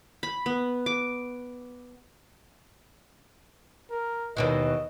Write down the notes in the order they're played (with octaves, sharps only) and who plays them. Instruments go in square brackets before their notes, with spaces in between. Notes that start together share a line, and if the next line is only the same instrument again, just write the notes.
[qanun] B5
B3
D6
[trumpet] A#4
[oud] D#2 B2 E3 [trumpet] D#5